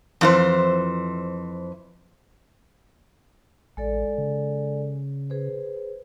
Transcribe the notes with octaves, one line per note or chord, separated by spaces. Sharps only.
F2 E3 C5
A1 G#3 A4 D5
C#3
G#4 B4 C5